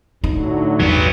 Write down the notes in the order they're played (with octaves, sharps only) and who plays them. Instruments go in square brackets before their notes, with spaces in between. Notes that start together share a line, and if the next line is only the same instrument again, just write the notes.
[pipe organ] A2 D3 F#3 [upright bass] D#4
[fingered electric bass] A1 E2 G2 [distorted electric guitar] F#3 B3